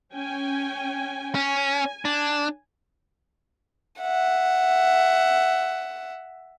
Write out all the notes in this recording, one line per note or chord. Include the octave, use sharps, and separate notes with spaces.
C#4 G5 G#5
C#4 G#5
D4
E5 F#5